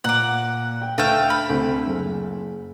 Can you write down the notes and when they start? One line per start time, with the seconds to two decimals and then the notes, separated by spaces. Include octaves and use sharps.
0.04 A#2 F#5 A#5 D6
0.82 G5
0.98 D2 A3 F5 G5 E6 E7
1.30 B5
1.50 D2 C3
1.87 F#1